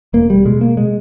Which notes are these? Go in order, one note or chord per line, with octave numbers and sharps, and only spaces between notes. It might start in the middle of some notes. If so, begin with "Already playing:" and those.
E1 A#3
G3
B2 G#3
A#3
G#3